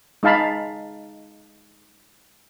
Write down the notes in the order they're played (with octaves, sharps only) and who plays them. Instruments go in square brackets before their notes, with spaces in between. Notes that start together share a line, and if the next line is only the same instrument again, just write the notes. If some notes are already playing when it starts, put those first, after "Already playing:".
[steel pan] G#3 D#4 F5 A5 B5